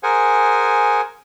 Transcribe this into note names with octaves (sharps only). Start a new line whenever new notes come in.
G#4 A#4 C5 F#5 G#5